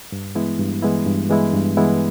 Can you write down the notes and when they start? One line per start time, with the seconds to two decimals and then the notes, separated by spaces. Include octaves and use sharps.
0.12 G2
0.35 E3 G#3 B3 E4
0.59 G2
0.82 E3 G#3 B3 E4
1.06 G2
1.29 E3 G#3 B3 E4
1.54 G2
1.77 E3 G#3 B3 E4